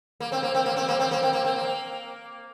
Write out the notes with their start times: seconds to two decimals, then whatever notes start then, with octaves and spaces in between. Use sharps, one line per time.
0.20 A#3
0.32 C4
0.43 A#3
0.55 C4
0.66 A#3
0.76 C4
0.88 A#3
1.00 C4
1.11 A#3
1.23 C4
1.33 A#3
1.45 C4
1.56 A#3